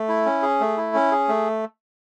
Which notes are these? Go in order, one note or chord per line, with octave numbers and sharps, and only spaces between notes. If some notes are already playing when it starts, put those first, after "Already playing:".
Already playing: A3
E4
C#4
G#4
A3
E4
C#4
G#4
A3